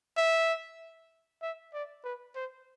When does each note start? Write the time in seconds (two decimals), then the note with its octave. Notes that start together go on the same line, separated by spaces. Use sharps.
0.17 E5
1.42 E5
1.74 D5
2.04 B4
2.36 C5